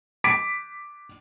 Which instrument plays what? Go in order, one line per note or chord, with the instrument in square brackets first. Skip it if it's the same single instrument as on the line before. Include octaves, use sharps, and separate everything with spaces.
[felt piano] D6 B6 D7